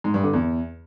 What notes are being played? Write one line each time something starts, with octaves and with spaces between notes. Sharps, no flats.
G#2
G2
D3
E2